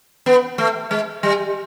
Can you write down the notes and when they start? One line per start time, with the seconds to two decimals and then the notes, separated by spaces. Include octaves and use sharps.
0.26 B3
0.58 A3
0.91 G#3
1.23 G3